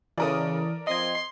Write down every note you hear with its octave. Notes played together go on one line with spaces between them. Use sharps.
C#3 E3 A4 A#4 D5 D#6
F3 C4 D#5 C6 G#6